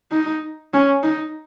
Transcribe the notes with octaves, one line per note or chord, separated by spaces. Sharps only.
D#4
C#4
D#4